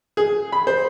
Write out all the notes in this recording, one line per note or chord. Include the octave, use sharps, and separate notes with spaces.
G#4
B5
C5